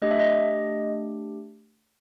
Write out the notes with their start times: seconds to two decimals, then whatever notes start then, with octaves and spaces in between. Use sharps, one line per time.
0.02 A3 D4 G4 D#5
0.11 E5
0.19 D#5